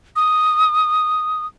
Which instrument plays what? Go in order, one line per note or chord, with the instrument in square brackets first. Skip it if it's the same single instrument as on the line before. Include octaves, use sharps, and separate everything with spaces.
[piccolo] D#6